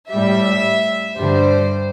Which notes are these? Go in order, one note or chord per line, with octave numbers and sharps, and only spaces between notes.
A2 G3 E5
G2 D3 G3 C5